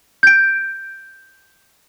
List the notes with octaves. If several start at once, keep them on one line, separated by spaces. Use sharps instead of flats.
G6 D7